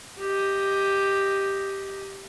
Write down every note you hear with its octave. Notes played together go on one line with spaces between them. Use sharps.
G4 D#5